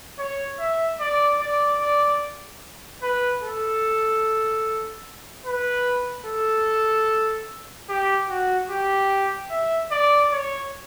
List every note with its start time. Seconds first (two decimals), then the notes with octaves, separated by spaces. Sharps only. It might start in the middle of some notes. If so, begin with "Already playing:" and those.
0.19 C#5
0.59 E5
1.00 D5
1.40 D5
1.81 D5
3.02 B4
3.43 A4
5.46 B4
6.27 A4
7.89 G4
8.29 F#4
8.70 G4
9.51 E5
9.92 D5
10.32 C#5